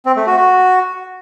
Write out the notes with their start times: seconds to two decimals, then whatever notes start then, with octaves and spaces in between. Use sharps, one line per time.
0.06 C4
0.16 A3
0.27 F#4
0.37 F#4